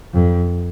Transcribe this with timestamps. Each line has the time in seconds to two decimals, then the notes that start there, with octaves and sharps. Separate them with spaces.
0.14 F2